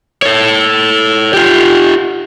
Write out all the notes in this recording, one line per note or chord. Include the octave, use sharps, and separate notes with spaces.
A4 C#5
F4 G4